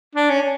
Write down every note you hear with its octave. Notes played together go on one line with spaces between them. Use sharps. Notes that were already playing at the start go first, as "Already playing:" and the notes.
D4
C#4